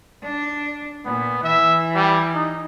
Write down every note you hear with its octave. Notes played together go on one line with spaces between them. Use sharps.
D4
A#2 B3
E3 E5
G3
D#4